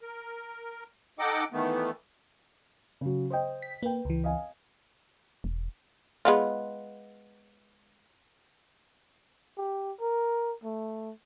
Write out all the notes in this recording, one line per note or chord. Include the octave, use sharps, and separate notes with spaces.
A#4
D#4 A4 D#5 F#5 G5 D6
D#3 E3 A3 B3
C#3 F#3
C5 D#5 G5
B6
A#3 B4 G5
C#2 E3
D#5 F5 G#5
E1
G#3 B3 F4
G4
A#4
A3